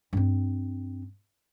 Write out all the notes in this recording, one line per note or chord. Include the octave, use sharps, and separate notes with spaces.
G2 C4